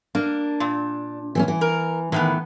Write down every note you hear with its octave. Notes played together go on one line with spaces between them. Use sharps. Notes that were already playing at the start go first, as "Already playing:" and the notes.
A#3 D4
A#2
E3 C4 C#4
E3
A#4
A2 D#3 E3 B3